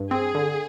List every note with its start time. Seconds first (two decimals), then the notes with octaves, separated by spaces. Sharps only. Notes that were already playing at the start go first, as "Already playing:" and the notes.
Already playing: G2
0.11 C4 G#4
0.35 D3